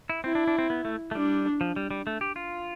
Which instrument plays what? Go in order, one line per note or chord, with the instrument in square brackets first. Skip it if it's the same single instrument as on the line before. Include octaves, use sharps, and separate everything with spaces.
[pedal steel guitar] E4
[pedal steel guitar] C4 [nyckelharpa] E4
[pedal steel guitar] D4
D4
C4
B3
A3
A3
[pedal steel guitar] G3 [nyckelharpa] D4
[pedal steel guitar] F3
G3
G3
A3
G4
F4